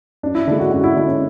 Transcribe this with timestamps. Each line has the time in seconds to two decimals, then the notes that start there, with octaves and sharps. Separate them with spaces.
0.23 F#2 D4
0.35 E4
0.47 D3 G#3 D4
0.59 F#4
0.71 F#2 F#4
0.84 E4
0.96 D3 G#3 D4
1.08 C#4